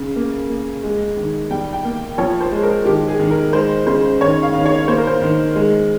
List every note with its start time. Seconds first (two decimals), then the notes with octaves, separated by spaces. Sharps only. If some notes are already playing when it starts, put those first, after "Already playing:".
Already playing: C#3
0.16 A#3
0.49 A#3
0.83 G#3
1.17 D#3
1.51 G3 G5
1.73 G5
1.85 A#3
2.18 F3 C#5
2.41 C5
2.52 G#3
2.63 A#4
2.86 D#3 G4
3.08 G#4
3.20 D#3
3.31 A#4
3.53 G#3 C5
3.87 C#3 C5
4.21 D#3 C#5
4.43 F5
4.54 D#3
4.66 C#5
4.88 A#3 C5
4.98 A#4
5.07 C5
5.22 D#3
5.56 G#3